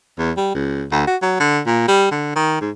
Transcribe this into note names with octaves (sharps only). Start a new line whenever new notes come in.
E2
G3
C#2
D2
F#4
F#3
D3
A#2
G3
D3
D#3
G#2